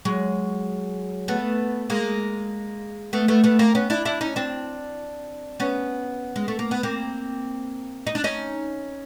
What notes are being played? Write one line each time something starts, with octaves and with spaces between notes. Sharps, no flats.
F#3 G#3
A3 B3
G#3 A#3
A3 B3
A3 B3
A3 B3
A#3 C4
B3 C#4
D4 E4
D4 E4
C#4 D#4
C4 D4
B3 C#4
G#3
A3
A#3
B3
A#3 C4
D#4
D4
C#4 D#4